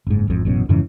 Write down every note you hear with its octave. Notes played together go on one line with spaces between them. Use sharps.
F#1 G#2
G#1 F2
A1 F#2 B2
F2 G#2 C#3 E3